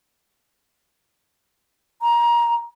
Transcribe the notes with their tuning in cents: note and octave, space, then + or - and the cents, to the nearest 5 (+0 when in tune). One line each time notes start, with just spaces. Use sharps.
A#5 +20